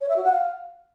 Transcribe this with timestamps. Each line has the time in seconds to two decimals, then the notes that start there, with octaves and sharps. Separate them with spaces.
0.01 C#5
0.09 E5
0.16 F#4
0.24 F#5
0.32 F5